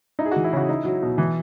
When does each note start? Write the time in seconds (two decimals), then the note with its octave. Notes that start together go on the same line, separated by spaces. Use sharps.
0.19 D#4 E4
0.25 G#4
0.31 F#4
0.36 E3
0.44 E4
0.53 C#3 F#4
0.69 D#4 E4
0.85 F#3
1.03 B2
1.18 E3